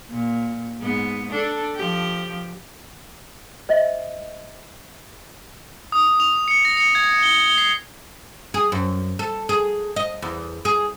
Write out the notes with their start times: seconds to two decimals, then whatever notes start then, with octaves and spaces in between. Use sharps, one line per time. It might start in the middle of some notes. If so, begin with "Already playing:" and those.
0.10 A#2
0.81 G#2 B3
1.31 D4 A4
1.75 F3 G4
3.69 C5 D#5 E5
5.92 D#6
6.20 F7
6.48 C#7
6.65 A#6
6.77 C#7
6.95 G#6
7.23 G7
7.44 G7
7.58 C7
8.54 G#4
8.72 F#2
9.19 A4
9.49 G#4
9.96 D#5
10.22 E2
10.65 G#4